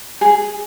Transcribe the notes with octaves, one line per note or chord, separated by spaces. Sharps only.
G#4